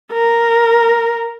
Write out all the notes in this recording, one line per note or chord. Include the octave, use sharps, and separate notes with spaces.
A#4